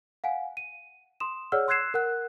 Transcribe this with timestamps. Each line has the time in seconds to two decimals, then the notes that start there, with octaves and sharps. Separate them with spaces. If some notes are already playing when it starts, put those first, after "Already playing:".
0.24 F5 F#5 G#5
0.57 D#7
1.20 C6 D#6 E7
1.52 G#4 C#5 D5 F#5 E6 F6
1.68 C6 E6 F#6 G#6 C7 E7
1.94 A#4 F#5 F#6